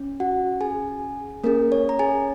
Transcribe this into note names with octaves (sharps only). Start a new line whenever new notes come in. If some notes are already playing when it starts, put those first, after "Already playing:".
Already playing: C#4
F#4 F#5
G#4 G#5
A#3 C#4 G#4 A#4
C#5
A#5
G#4 G#5